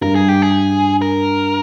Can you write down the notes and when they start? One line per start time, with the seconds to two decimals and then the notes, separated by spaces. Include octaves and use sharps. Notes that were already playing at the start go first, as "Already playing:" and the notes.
0.01 G2 A#4
0.15 G#4
0.29 G4
0.42 G#4
1.02 A#4